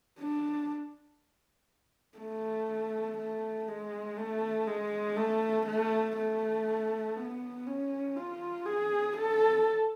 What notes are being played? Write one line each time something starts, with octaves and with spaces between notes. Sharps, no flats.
D4
A3
A3
G#3
A3
G#3
A3
A3
A3
B3
C#4
F4
G#4
A4